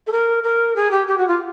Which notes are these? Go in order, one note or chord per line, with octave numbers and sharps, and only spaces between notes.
A4
A#4
A#4
G#4
G4
G4
F#4
F4